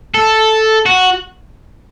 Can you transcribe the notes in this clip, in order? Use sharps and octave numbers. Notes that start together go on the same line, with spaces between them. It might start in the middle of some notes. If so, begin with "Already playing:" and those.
A4
F#4